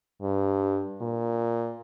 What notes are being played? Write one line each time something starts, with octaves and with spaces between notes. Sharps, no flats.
G2
A#2